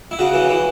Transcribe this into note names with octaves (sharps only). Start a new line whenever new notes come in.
E4
C#3 F#4
E3
E3